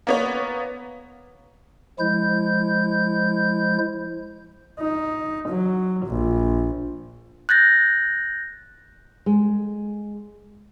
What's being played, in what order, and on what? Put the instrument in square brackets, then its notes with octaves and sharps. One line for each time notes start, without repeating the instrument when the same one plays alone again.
[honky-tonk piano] A#3 B3 C#5
[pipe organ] F3 G#3 E4 G6
[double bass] D#4
F#3
A#1
[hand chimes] F#6 G6 A6 A#6
[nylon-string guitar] G#3